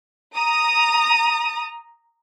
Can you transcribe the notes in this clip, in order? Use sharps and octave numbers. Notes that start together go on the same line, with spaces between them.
A#5 D#6